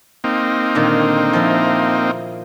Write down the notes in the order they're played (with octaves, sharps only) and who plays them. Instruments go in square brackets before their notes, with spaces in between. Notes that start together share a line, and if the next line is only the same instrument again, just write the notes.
[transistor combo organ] A#3 C4 D#4
[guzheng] A#2 D3 D#3
F3 E4